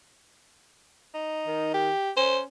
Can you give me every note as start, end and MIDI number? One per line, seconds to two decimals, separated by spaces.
1.14 1.71 63
1.47 1.90 51
1.74 2.11 67
2.17 2.47 61
2.17 2.40 72